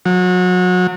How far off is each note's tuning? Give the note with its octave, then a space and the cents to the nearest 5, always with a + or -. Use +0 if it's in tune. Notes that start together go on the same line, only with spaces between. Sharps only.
F#3 -30